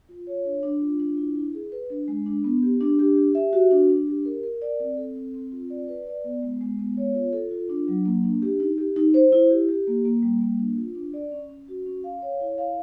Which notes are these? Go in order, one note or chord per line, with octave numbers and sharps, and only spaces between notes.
F4
C#5
D4
D4
F4
D4
E4
E4
G#4
B4
D4
G#3
D4
B3
G4
D4
G4
G4
E5
F#4
D4
D4
G4
A#4
A#4
D5
C4
A4
C4
C4
F4
D5
B4
D5
B3
G#3
G#3
B3
C#5
F4
A4
F4
D4
F#3
A#3
D4
G4
D#4
G4
D#4
C5
E4
G4
G4
A#3
A#3
G3
A#3
D4
F4
D4
D5
C#4
C#4
F#4
C#4
F5
C#5
E4
F5